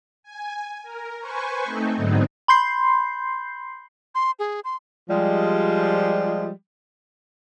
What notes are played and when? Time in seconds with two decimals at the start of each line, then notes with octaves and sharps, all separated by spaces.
0.23 G#5
0.82 A#4
1.20 B4 C5 G#5 C#6
1.64 A3 C4 D#4 A4
1.95 G#2 D3 F#3 B3 C4 D#4
2.48 B5 C6 G6 C7
4.15 C6
4.39 G#4
4.64 C6
5.10 F3 G3 G#3